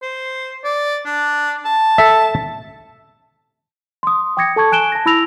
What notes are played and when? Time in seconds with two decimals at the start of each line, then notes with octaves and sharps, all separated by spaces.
0.02 C5
0.64 D5
1.06 D4
1.65 A5
1.98 A4 E5
4.03 C6 D#6
4.37 G5 D6 D#6 G#6 A#6 C#7
4.56 A4 A5 C#6 G#6
4.72 G#5 F#6 D7 E7 G7
4.92 A5 A#6
5.06 E4 B5 E6 A#6 F7